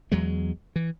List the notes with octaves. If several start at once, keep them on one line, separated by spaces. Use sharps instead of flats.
E2 F#3 G#3
E3